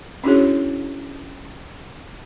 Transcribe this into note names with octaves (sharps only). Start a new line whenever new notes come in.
C#4 D4 E4 F#4 G#4 C#5